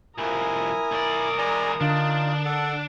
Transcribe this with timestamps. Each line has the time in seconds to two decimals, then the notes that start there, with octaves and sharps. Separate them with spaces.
0.18 C2 F2 E4 A#4 G#5 D#6
0.91 B1 D5
1.38 E3 G#3 D5 G#5 A#5
1.81 D3 D4 D#4 F4
2.45 A4 F#5